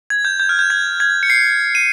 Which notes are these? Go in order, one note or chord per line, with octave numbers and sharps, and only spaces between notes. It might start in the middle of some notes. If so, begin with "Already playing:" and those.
G#6
G6
G6
F6
G6
G#6
G#6
C#7
C7
D#7